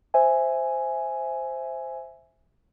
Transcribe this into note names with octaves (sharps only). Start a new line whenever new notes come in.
C5 E5 G#5